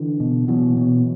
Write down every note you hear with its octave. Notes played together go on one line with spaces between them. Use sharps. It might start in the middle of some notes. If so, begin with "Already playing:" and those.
Already playing: D3 E3
B2
B2 E3 F#3
B2